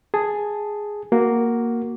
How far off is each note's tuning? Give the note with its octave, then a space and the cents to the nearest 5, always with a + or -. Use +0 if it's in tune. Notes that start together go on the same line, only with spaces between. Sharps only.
G#4 +0 A5 +0
A#3 +0 F#4 +0